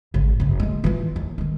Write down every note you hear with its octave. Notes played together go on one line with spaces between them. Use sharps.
G#1 C#3
F#1 C#3
G#3 A3
E3 F4
D#2
D#3 G#3